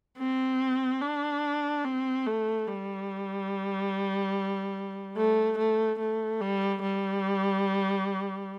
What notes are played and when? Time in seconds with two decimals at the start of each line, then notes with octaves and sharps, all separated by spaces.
0.18 C4
1.01 D4
1.85 C4
2.26 A3
2.68 G3
5.17 A3
5.58 A3
5.99 A3
6.41 G3
6.82 G3